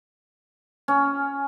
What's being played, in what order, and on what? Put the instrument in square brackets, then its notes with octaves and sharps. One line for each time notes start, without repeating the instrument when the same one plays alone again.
[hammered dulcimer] C#4